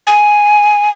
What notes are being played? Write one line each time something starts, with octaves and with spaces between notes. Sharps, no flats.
G#5